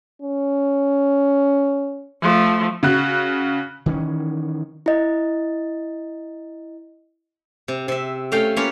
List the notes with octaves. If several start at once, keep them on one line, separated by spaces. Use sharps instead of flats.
C#4
F3 A3
C#3 F#4 F#6
D#3 E3 C#4
E4 D#5
C3
C3 E5
A3 C#4 F5 G5
A#3 C#4 F4 B4 C#5